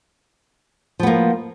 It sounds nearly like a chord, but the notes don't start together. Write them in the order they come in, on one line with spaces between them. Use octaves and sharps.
F3 B3 A#3